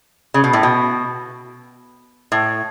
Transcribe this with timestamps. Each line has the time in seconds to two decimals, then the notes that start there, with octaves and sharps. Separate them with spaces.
0.34 C#3
0.44 B2
0.53 A2
0.63 B2
2.32 A2